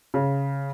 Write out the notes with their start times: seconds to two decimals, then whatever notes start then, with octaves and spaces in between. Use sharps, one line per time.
0.14 C#3